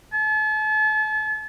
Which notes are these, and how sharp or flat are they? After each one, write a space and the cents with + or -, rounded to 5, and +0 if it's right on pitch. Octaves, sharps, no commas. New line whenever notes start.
A5 -40